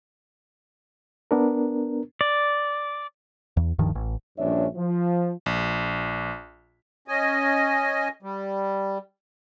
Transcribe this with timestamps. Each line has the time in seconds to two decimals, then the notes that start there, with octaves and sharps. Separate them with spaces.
1.31 B3 D4 A#4
2.21 D5
3.57 E2
3.79 D1 G2 D#3 F3
3.95 A1
4.38 A#1 G2 C#4 D4 C#5 E5
4.75 F3
5.46 A#1
7.08 C#4 D#5 G#5
8.22 G3